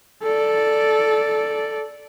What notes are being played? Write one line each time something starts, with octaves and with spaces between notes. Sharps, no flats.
A4 D5